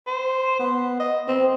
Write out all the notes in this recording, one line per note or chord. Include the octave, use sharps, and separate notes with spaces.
C5
B3
D#5
C4